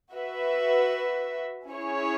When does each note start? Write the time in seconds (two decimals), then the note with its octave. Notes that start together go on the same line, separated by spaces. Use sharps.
0.15 F#4 B4 E5
1.70 C#4 E4 G#4 C#5